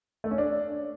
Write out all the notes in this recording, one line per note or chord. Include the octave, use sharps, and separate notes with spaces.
A3
C#4
D4